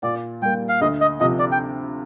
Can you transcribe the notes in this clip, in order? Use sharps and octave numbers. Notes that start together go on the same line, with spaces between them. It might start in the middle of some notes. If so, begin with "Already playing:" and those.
A#2 D5
G3 A#3 G5
F5
D2 D#5
D#5
C3 F3 D#5
D5
G5